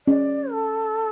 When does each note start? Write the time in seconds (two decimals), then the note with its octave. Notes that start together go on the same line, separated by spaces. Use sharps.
0.07 C#4 D5
0.52 A4